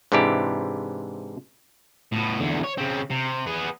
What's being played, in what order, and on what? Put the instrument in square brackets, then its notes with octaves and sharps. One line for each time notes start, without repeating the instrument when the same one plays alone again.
[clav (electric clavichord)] G#2 C3 E3 D4 E4 G4
[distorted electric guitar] A2 B3
E2 D3
C#5
C#3 C4
C3
B3 G#4